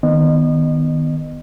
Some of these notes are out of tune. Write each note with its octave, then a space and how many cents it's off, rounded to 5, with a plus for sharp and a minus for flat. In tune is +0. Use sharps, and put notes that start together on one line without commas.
D#3 +0 B3 +0 D#5 -30